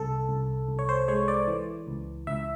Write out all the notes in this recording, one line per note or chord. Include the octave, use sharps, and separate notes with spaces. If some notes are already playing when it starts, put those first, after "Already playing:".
Already playing: C2 A4
C2
C2
C#5
C5
G#3 C#5
D5
E3
C#2
C#2 E5